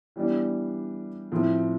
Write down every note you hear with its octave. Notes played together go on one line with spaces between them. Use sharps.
E3 G3 B3 D4 G4
A2 F3 C4 E4